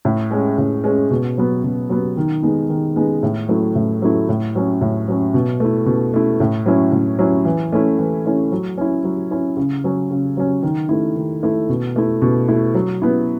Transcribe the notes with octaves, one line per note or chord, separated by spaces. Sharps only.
A2
G#3 C#4
A2
G#3 C#4
B2
F#3 B3
B2
F#3 B3
D#3
G#3 B3 D#4
D#3
G#3 B3 D#4
A2
F#3 A3 E4
A2
F#3 A3 E4
A2
F#3 C#4
A2
F#3 C#4
B2
A3 E4
B2
A3 E4
A2
F#3 C#4 E4
A2
F#3 C#4 E4
E3
A3 C#4 E4
E3
A3 C#4 E4
F#3
C#4 E4
F#3
C#4 E4
C#3
F#3 C#4
C#3
F#3 C#4
D#3
A3 E4
D#3
A3 E4
B2
A3 E4
B2
A3 E4
F#3
B3 E4